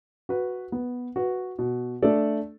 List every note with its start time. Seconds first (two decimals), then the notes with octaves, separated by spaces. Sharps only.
0.29 F#4 B4
0.72 B3
1.16 F#4 B4
1.59 B2
2.02 A3 D4 A4 D5